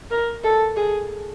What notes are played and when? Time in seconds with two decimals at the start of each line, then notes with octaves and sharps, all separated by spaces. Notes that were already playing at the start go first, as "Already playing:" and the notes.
0.11 A#4
0.44 A4
0.77 G#4